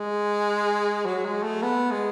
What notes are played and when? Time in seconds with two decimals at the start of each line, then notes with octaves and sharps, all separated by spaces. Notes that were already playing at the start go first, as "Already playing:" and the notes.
Already playing: G#3
1.05 F#3
1.25 G#3
1.43 A3
1.62 B3
1.91 G#3